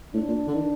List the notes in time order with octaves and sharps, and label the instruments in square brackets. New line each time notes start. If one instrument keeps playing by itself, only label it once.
[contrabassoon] A2 [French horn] D4
[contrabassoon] A#2
D3
D#3